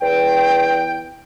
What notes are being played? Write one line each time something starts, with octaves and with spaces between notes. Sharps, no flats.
E2 G5